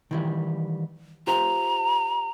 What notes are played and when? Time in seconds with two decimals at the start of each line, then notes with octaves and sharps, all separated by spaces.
0.11 D#3 E3 G3
1.27 F4 G4 C5 A#5